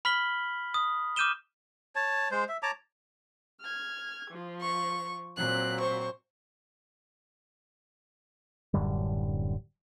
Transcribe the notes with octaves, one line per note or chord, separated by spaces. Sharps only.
B5 F6 B6 F#7 G7
D#6
D6 F6 G6 D#7 E7 G7
C#5 A5
G#3 C5
E5
C#5 A5 A#5 D6
F6 G#6
F3
C#6
A#2 F#3 C4 F#6
C5 C#6
D1 F#2 D3 G3